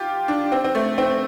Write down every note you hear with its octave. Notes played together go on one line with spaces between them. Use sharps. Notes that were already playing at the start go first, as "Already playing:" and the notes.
Already playing: F4 G4
D4
C4
C4
A3
C4